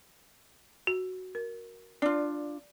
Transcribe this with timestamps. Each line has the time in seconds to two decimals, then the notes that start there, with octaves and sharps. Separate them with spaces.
0.87 F#4
1.35 A#4
2.02 D4 F4 D5